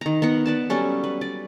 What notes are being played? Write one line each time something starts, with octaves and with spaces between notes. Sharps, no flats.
D#3 A#5
B3 A#4 F#5
B4 D5 A5
F#3 G3 C#4 A4
B4
D5